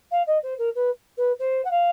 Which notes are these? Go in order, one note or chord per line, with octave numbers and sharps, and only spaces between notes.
F5
D#5
C5
A#4
B4
B4
C5
F#5
F5